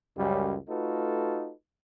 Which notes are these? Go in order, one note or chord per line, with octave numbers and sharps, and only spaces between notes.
C#2 F#2 G3
A3 D#4 F4 F#4 A4 B4